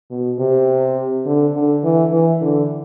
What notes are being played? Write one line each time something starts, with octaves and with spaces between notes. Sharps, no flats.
B2
C3
D3
D3
E3
E3
D3